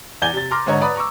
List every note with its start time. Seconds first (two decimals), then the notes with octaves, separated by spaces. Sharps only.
0.22 E2 D5 G#5 G6 G#6 G7
0.33 C3 A6
0.51 A#5 C6 D6 F6 A#6
0.66 G#1 G#2 D3 C#5 D#5 A#5
0.81 B4 D5 A#5 B5 D#6
0.96 A#5 C#6 D6 E6